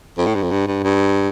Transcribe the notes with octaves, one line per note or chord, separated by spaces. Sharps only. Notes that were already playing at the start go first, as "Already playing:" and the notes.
F2
A2
G2
F2
G2
G2
G2